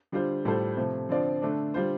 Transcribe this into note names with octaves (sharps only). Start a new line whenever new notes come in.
D3 G3 F4 C5
A2 G3 F4 A4 C5
C3 F3 A3
D3 F3 C4 F4 D5
D3 A3 D4
D3 G3 F4 C5